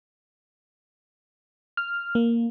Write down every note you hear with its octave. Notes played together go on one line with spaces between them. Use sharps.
F6
A#3